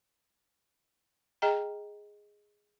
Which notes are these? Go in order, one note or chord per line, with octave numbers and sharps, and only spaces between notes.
G#4 D#5 G5 A#5